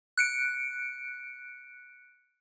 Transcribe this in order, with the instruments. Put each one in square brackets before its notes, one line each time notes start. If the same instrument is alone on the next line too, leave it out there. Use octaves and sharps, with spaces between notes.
[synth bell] F#6 C#7 D7